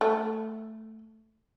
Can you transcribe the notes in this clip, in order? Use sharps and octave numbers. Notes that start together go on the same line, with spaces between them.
A3